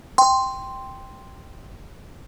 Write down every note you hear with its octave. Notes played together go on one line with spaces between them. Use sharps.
G5 C6